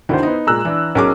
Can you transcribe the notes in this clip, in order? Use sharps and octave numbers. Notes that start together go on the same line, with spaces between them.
D2 D3 D#3 E4 C5
B3 D#4
A#2 G#3 A#5 E6 F#6
E3 D4
B1 C#4 G#4 A#4 D6